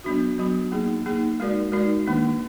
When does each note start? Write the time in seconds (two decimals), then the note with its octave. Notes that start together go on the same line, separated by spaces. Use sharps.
0.04 F#3 B3 D4 F#4
0.38 F#3 B3 D4 F#4
0.72 A#3 D#4 G#4
1.06 A#3 D#4 G#4
1.40 G#3 D#4 F#4 A#4 D5
1.72 G#3 D#4 F#4 A#4 D5
2.07 D#3 A#3 D4